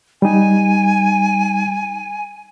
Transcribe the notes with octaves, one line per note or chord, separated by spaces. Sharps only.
G3 D#4 G#5